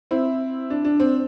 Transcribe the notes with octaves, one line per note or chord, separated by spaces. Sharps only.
C4 E4
D4
D4
C4